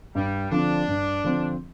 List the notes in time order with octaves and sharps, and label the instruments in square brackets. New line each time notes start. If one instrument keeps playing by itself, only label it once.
[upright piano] G2 [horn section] G3
[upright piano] D3 F3 C4 [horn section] D4
[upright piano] G2
D3 F3 C4